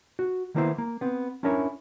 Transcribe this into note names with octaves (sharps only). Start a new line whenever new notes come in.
F#4
D#3 E3 A#3 B3 E4 C5
A#3
B3 C4
C#4 D4 E4 A#4 C#5